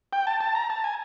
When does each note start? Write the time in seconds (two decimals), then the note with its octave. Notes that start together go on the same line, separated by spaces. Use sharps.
0.13 G5
0.27 A5
0.40 A5
0.55 A#5
0.70 A5
0.84 G#5